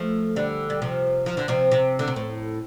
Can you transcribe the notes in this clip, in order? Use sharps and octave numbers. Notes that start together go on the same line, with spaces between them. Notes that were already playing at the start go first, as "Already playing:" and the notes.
Already playing: F3 A3
D3 G3
G3
C3 F3
F3
D3
C3 F3
C3
D3
C3
A2